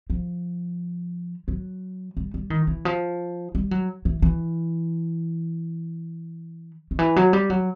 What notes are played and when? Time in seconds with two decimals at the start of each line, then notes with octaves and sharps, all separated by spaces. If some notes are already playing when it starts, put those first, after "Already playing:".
0.10 F3
1.48 F#3
2.17 G3
2.34 G3
2.50 D#3
2.67 E3
2.85 F3
3.55 G3
3.71 F#3
4.05 E3
4.22 E3
6.91 D#3
6.99 E3
7.16 F#3
7.33 G3
7.50 F#3